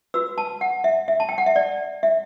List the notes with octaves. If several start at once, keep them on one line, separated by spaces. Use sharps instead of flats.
F#4 B4 E6
A5
F#5
E5
E5
A5
G5
F#5
E5
D5
E5